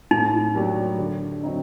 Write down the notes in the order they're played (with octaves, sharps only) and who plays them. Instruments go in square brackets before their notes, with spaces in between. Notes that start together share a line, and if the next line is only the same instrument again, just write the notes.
[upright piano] A2 [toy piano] D#4
[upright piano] F#3 A#3 D4 G4
D3
F#3 C4 D#4